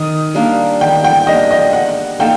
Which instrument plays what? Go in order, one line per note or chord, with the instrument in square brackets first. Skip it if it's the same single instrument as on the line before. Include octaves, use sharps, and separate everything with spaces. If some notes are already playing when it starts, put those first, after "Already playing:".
Already playing: [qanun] D#3 [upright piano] D#6
[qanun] G3 A#3 D4
[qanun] D#3 [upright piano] G5
[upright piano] G5
[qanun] G3 A#3 D4 [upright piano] D#5
[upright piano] D#5
[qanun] G3 [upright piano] F#5
[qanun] A#3 D#4 A4 [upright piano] G5